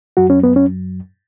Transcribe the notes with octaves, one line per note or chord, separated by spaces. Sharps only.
F#2 F#3 F#4
C#4
B3
C#4